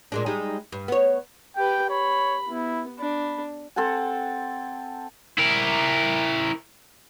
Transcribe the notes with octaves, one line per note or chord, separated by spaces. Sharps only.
A#2 G#3 D4
G3 G#3 D#4
G2
B3 C#5
G4 B4 G5
C#5 B5
B3 E4
D4 B5
C4 A4 F#5 G#5
E4 A#4